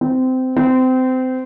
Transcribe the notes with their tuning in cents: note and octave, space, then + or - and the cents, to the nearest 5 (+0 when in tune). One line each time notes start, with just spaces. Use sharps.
C4 -20
C4 -25